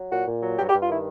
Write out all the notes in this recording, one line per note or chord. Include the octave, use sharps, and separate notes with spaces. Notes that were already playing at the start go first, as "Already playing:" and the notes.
Already playing: F#3
A#2 F#4
A#2
F#3
G2 G4
G4
G2
F4
D#3 E4